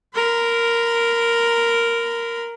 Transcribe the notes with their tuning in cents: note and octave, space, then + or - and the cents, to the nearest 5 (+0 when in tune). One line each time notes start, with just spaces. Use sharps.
A#4 +0 B5 +45